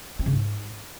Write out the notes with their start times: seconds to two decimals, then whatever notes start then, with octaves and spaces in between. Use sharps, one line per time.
0.19 C4
0.26 C#3
0.33 G#2